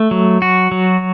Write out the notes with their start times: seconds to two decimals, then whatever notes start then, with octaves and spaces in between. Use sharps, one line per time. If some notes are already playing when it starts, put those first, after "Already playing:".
Already playing: A3
0.11 F#3
0.42 F#4
0.72 F#3